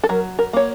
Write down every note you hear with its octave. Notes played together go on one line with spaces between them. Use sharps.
A4
F#3 A#4
A#4
A#3 C#5